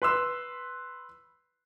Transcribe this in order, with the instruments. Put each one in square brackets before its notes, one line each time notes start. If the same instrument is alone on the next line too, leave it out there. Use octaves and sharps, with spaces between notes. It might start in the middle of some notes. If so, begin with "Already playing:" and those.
[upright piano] B4 C6 E6